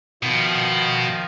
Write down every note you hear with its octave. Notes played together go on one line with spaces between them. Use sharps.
B2 D#3 F3